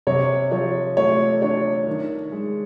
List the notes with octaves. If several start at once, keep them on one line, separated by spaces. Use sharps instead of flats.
C3 C#5
F3 C#5
A3 C#5
D4 C#5
D#3
G#3